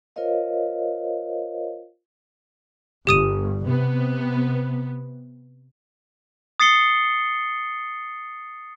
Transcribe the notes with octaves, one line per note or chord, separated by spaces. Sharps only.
F4 A#4 C5 C#5 D#5 F5
G1 G4 D#6 D#7
C3 B3
D#6 A6 C7 C#7 G7